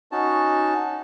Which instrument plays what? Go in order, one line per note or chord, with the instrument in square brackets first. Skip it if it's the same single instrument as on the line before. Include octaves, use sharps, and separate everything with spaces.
[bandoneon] C#4 D#4 F#4 A5